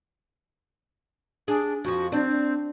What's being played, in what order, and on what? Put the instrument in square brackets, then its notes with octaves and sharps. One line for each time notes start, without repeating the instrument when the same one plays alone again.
[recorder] D4 [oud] G#4
[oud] F2 F3 [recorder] F#4
[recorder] C4 [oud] D4